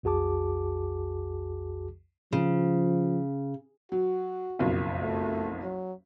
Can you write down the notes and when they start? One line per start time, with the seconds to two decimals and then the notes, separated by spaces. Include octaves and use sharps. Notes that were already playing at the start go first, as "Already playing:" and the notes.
0.03 B1 F2 F#4 G#4 A5 D6
2.32 C#3 F3
3.92 F#3 F#4
4.59 F#1 B1 F2
5.01 A3
5.62 F#3